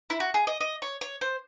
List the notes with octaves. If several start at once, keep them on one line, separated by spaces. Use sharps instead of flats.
E4
F#4
G#4
D#5
D#5
C#5
C#5
C5